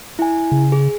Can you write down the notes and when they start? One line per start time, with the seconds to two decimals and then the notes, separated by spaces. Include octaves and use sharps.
0.19 E4 G#5
0.52 C#3
0.72 G#4